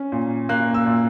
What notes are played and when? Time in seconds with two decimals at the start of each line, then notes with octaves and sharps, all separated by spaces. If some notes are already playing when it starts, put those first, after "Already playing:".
Already playing: C#4
0.12 A#2
0.49 A#3 F#6
0.74 E6
0.86 A#2